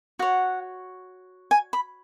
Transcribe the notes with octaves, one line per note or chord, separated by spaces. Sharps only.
F#4 C#5 F#5
G#5
B5